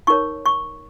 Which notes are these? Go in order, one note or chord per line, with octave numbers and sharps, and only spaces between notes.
D#4 A#4 C#5 C#6
C#6